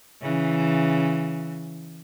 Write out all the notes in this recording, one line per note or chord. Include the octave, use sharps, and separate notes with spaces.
C#3 E3